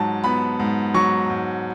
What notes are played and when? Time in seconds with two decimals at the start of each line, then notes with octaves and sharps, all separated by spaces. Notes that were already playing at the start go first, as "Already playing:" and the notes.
Already playing: G#2 F#3 A5
0.24 B3 B5
0.59 G#2
0.94 F#3 C#6
1.30 G#2